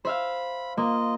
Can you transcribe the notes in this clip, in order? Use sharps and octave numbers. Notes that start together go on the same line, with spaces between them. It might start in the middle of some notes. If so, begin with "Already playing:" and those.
C5 E5 F5 B5
A#3 F4 D#5